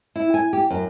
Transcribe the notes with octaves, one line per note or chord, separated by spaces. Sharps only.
E4
G#5
G4
F#2